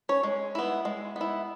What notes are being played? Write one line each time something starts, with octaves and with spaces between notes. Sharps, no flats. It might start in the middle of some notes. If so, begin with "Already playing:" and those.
C#4 C#5
G#3
B3 E4
G#3
B3 E4